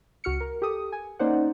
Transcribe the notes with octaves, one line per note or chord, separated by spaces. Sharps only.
C#2 F#4 F6 C#7
A#4
G4 A4 D#6
G#5
A#3 C#4 D#4 C5 D5 F#5